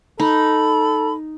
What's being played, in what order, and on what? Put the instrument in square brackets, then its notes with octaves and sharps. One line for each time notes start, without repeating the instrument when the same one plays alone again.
[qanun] D#4 [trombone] A4 [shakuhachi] B5